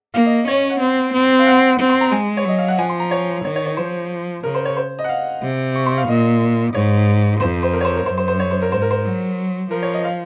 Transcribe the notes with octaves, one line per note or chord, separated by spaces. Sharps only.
A#3 F5
D#5
C#4 C#5
F#5
C4
C4
F5
F#5
C4
C6
A#5
G#3 G#5
C#5
F#3 D#5
F5
F#5
F3 G#5
C6
A#5
C#5
D#3 C#5
C#5
C#5
F3 C5
C#3 A#4
C5
C#5
C5
D#5
F#5
F5
C3
C#6
C6
F5
A#2 D#5
G#2 C#5
F2 C5
C5
A#4
C#5
C5
A#4
F#2 C5
C5
C5
C#5
C5
A#4
G#2 C5
A#4
C5
F#3
F3 A#4
C#5
D#5
F5